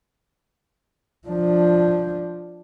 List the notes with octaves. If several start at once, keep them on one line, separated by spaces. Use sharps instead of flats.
F3 D4